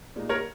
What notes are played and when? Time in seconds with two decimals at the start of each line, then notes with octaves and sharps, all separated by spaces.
0.16 A#2 G#3 D#4
0.29 A#4 C#5